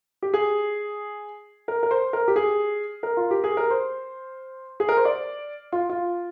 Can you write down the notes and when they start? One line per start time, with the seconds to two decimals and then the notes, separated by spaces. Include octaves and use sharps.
0.22 G4
0.34 G#4
1.68 A#4
1.83 A#4
1.91 C5
2.13 A#4
2.28 G4
2.36 G#4
3.03 A#4
3.17 F4
3.31 G4
3.44 G#4
3.57 A#4
3.70 C5
4.80 G#4
4.89 A#4
4.97 C5
5.05 D5
5.72 F4
5.89 F4